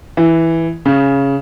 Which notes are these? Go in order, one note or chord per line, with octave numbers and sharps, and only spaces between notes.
E3
C#3